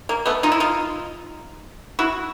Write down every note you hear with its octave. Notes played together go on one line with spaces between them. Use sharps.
A#3
A3 B3
D#4 F4
E4
D#4 F4
E4 F#4